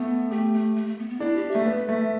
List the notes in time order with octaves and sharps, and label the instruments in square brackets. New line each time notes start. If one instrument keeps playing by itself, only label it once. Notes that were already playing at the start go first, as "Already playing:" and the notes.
Already playing: [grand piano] A3 [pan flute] B3
[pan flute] A3 [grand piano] G4
[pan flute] A3
A3
A3
B3
B3
[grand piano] D4 [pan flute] E4
[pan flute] G4
[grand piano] A3 [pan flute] E5
[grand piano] B3
A3